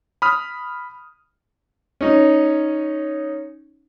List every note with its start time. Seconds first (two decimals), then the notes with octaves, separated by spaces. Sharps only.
0.22 B5 D#6 F6
2.01 C#4 D#4